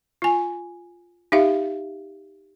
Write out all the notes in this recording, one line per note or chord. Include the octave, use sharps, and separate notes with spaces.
F4 G#5
D#4 G4 E5 F5